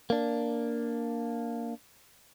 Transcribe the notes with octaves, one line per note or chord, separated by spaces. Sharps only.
A#3 D4